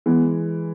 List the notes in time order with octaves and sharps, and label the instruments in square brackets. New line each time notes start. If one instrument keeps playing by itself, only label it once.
[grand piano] E3 G#3 [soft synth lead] B3